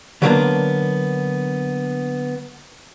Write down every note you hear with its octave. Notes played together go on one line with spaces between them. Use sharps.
D3 F#3 G3 A#3 B3 D4